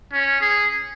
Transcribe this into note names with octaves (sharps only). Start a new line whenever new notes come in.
C#4
G#4